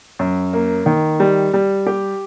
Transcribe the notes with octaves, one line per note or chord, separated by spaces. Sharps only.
F#2
A#3
D#3
G3
G3
G4